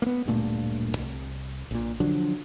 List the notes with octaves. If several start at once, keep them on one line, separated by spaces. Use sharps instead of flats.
A#3 B3
D1 G2 A#2 A3
C2
A#1 A#2
D3 F3 F#3 D4